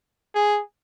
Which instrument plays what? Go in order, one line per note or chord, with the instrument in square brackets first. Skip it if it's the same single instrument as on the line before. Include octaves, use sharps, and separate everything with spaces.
[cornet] G#4